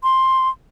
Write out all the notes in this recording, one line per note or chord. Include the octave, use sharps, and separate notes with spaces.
C6